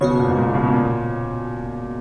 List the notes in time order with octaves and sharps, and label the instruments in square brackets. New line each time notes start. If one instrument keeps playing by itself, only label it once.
[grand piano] C#3 [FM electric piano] B3 F#4 C#5
[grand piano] B2
A#2
G#2
A#2
B2
C#3
B2
A#2